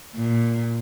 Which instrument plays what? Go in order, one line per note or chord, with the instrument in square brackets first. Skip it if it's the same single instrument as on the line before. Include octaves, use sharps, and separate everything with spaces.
[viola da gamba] A#2